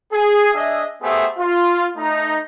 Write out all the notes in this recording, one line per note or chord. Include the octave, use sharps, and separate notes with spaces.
G#4
D4 G#4 D#5 E5
A3 B3 G4 G#4 C5 E5
F4
A3 D#4 A#5